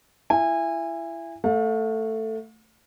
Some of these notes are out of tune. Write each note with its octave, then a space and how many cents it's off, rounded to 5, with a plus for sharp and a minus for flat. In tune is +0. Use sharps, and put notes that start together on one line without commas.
E4 +25 G#5 -25
A3 +10 F5 +45